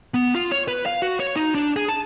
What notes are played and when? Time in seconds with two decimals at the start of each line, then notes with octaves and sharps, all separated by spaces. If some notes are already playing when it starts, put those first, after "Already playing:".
0.14 B3
0.35 F4
0.52 C#5
0.68 B4
0.86 F5
1.02 F#4
1.20 C#5
1.36 D#4
1.55 D4
1.76 G#4
1.89 A5